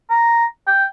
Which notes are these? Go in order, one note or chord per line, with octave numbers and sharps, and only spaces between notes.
A#5
G5